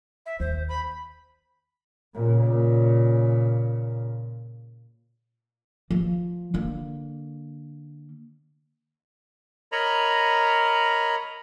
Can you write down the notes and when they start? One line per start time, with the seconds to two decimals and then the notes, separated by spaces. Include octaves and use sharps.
0.26 E5
0.40 D#2 C5
0.69 B5
2.15 A#2 C#3
5.91 F3
6.54 D3 A#3
9.72 A#4 C#5 D#5 A#5 B5